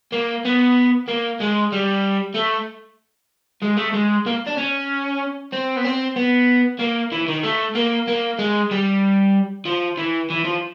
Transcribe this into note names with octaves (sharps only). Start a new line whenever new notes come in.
A#3
B3
A#3
G#3
G3
A3
G#3
A3
G#3
A#3
D4
C#4
C4
B3
C4
B3
A#3
E3
D#3
A3
A#3
A#3
G#3
G3
F3
E3
E3
F3